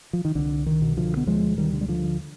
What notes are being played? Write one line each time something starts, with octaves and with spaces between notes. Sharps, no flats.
F3
D#3
C2 D3
D#3
B2
D3 F3
B3
D2 F3 G#3
D#3 G3
D3
G3
D3 F3